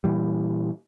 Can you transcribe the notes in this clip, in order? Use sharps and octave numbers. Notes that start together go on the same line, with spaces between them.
A#2 E3 G3